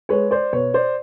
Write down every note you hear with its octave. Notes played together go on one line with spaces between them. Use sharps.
G#3 B4 C#5
C5 D5
B2 B4 C#5
C5 D5